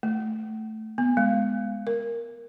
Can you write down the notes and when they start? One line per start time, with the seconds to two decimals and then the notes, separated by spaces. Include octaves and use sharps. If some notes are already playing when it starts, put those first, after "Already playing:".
0.03 A3
0.98 B3
1.17 G#3
1.87 A#4